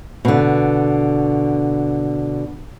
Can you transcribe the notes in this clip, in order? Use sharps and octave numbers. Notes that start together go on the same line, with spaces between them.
B2 D3